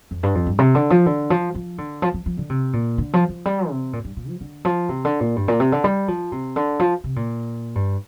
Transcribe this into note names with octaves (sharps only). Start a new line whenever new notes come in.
F2
G2
F2
G2
C3
D3
F3
D3
F3
F3
D3
F3
F3
F3
D3
C3
A#2
D3
F3
F3
G3
C3
A#2
G2
A#2
F3
D3
F3
C3
D3
A#2
G2
A#2
C3
D3
G3
F3
C3
D3
F3
C3
A#2
G2